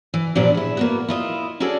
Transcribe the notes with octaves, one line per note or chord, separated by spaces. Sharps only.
E3
A#2 E3 F3 B3 D4 G4
E4 G#4
A#3 B3 F#4
E4 F4 D#5
C#4 D4 F#4 G#4 A4 D5